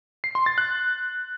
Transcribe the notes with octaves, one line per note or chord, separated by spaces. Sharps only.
C7
C6
A6
F#6